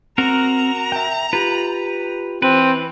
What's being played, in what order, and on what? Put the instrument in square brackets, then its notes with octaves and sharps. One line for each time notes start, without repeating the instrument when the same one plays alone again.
[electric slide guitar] C4 [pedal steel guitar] F#4 A#4 [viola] A#5
[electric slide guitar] E5 G5
[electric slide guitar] F4 G4 [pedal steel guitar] B4
[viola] E3 [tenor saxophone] C4 [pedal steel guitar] B4